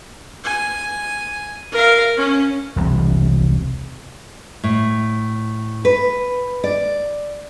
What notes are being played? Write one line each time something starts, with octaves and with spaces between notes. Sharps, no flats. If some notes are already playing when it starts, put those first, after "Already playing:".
G#5
A#4 F5
C#4
E1 C2
A2
B4
D5